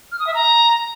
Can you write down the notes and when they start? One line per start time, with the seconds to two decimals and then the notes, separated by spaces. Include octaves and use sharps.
0.12 F6
0.19 D#6
0.27 E5
0.34 A#5